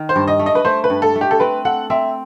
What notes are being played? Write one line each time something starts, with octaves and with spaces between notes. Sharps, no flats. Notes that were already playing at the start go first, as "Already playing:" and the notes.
Already playing: D#3
C5
G2
D#5
A3
D#5
B4
A3 C5
B4
G2
A4
A3
G4
A4
C4 B4
A4 F#5
C4 E5